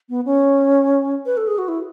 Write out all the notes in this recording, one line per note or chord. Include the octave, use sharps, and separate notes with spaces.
B3
C#4
B4
A4
G#4
F#4
E4